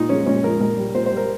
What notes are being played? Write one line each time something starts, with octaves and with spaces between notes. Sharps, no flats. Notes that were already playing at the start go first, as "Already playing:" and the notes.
Already playing: A#2 D#4
F3 G#3 C#4
A#2 C#4
F3 G#3 A#4
A#2 A#4
G3
A#2 C5
C5
G3
A#4